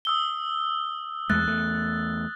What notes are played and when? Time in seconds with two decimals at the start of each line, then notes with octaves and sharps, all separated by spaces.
0.05 D#6 E6 G7
1.30 E2 G#3 A3 F#6 A6
1.46 E2 A3